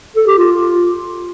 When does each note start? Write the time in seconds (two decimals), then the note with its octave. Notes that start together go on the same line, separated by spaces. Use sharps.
0.16 A4
0.27 G4
0.38 F4